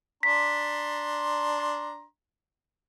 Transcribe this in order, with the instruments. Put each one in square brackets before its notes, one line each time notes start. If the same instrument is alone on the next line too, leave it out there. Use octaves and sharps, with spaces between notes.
[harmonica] D4 A#5 C6 [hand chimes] B6